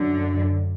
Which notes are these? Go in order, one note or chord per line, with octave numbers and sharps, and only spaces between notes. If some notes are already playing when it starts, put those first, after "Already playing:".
Already playing: F#2 D3